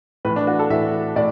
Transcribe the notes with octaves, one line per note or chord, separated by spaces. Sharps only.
A2 E3 B4
D4
F#4
A4
A2 E3 E5
A2 D5